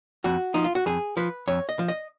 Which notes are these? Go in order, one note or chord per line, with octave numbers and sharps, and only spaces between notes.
F2 F#4
F3 D#4
F4
F#4
F2 G#4
F3 B4
F2 C#5
D#5
F3
D#5